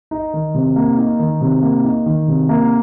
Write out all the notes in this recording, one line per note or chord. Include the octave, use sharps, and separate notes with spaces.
D#4
D#3
C3
A#3
D#4
D#3
C3
A#3
D#4
D#3
C3
A#3